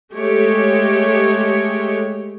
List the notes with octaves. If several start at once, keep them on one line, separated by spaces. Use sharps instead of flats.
G#3 A3 G4 C#5